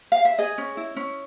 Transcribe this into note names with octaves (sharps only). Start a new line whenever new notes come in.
F5
E5
G#4 D#5
C#4
E4
C#4